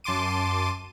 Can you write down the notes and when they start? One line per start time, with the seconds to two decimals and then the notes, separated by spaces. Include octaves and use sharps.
0.04 F#2 A5 C6 D6 D#7